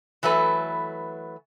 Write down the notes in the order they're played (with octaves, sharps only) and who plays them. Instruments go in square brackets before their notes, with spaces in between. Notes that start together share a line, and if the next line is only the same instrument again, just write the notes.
[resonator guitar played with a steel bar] E3 F#3 A3 B4